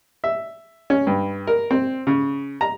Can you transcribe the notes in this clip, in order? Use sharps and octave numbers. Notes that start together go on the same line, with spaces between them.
E5
C#4
G2
A#4
C4
C#3
A#5